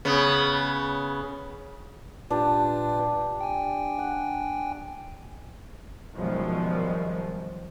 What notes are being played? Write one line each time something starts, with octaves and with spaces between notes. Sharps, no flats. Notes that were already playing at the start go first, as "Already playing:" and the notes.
C#3 B3
A#2 D4 F4 G4 B4
G5 G#5
F#5
F#2 B2 D#3 F3 G3 G#3